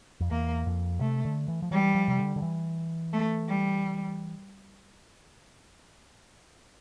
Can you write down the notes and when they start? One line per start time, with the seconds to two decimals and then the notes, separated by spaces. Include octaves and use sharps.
0.20 F2
0.30 E2 A#3
0.66 F2
1.01 C3 A3
1.25 D3
1.48 E3
1.62 F3
1.71 E3 G3
1.95 F3
2.08 C3
2.18 D3
2.36 D3
2.42 E3
3.13 A3
3.48 G3